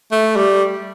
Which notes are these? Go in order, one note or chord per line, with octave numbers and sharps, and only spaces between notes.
A3
G3